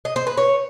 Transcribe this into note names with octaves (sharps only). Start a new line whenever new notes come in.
D#5
C5
B4
C#5